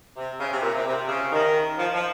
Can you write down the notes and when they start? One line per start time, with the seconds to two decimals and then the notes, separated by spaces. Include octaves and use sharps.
0.17 C3
0.40 C#3
0.51 C3
0.62 A#2
0.75 C3
0.87 C3
1.09 C#3
1.32 D#3
1.78 F3
1.94 F3